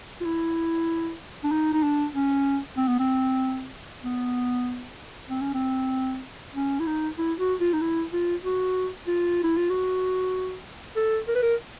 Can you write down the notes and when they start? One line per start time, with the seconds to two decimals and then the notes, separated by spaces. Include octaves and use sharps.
0.21 F4
0.25 E4
1.44 D4
1.52 D#4
1.73 D#4
1.83 D4
2.14 C#4
2.77 C4
2.88 B3
3.00 C4
4.03 B3
5.30 C4
5.41 C#4
5.54 C4
6.55 C#4
6.80 E4
6.87 D#4
7.18 E4
7.40 F#4
7.60 F4
7.73 D#4
7.81 E4
8.13 F4
8.44 F#4
9.07 F4
9.44 E4
9.57 F4
9.70 F#4
10.96 A4
11.28 A#4
11.35 B4
11.43 A#4